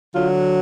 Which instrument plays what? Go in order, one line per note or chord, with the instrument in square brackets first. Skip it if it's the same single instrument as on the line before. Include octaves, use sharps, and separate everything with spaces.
[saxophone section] D3 F#3 F4